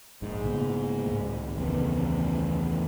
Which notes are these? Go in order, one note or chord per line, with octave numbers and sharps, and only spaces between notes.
A#1 G#2
C#3 A#3 B3
C#2 A2 D#3
E2 C#3 B3